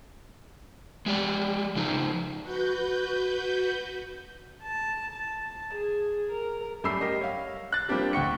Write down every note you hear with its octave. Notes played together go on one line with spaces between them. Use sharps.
G#3 G4 D5
C#3 F3 D#4
F#4 B4 G6
A5
A5
G#4
A#4
F#2 G3 A3 B5 E6 C7
G4 A#4 D#5
C#5 F5
F#6 A6
F3 G3 A#3 C4 D4 G4
D2 G5 C#6 C#7